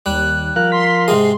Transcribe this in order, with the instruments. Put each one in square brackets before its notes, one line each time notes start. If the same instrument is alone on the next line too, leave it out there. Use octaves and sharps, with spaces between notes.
[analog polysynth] D#2 [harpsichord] G3 [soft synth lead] F#6
[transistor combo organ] F3 A#4 F5 [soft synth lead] F#6
[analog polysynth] C6 [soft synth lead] B6
[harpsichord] G#2 C3 D#5 [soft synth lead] G#4